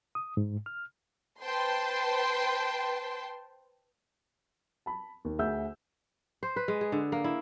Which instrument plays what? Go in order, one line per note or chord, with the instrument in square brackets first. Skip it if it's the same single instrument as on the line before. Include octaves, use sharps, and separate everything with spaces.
[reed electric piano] D#6
G#2
F6
[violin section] B4 C5 G5 A5 C6
[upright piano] A5 B5
D#2
D2 G#4 E5 F#5 E6 G6
[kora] C5
B4
G#3
G#4
D3
A#3
E4